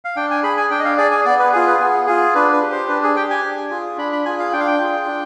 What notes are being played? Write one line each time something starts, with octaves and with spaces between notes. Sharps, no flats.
F5
D4 G5
G#5
G#4 B5
G#5
D4 G5
D#5
F5
G#4 D5
G#5
B3 D5
B4
F4 G#4
B4
B3 G#4
F4 G#4
D4 B4
B4
G4
C5
D4 B4
G#4
G4 G5
G#5
D4
F4 G#4
D4 B5
B5
F4 G#4 G#5
F5
D4 G5
F5
G5
F4 G#4
D4